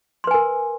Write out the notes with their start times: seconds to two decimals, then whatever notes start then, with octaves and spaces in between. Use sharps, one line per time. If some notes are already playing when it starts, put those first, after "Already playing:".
0.24 C6
0.27 B4
0.31 G#5
0.34 A#4